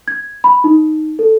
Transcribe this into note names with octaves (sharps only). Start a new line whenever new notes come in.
G#6
B5
D#4
A4